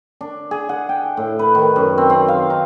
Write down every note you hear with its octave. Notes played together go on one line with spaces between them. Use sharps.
D4
G#4
F#5
G5
A2
B4
D#3
F#2
C4
C4
F5
D#4